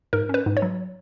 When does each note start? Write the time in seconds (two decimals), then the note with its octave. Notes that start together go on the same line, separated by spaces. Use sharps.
0.13 G#2 A#4
0.29 C#4 B4
0.46 G#2
0.57 C#5
0.62 F#3